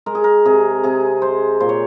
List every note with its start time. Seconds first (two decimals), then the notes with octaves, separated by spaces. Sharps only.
0.06 G#3 A#4
0.15 G#4
0.24 A#4
0.45 C3 G#4
0.83 C3 G#4
1.22 G#3 C5
1.60 A#2 C5
1.69 C#5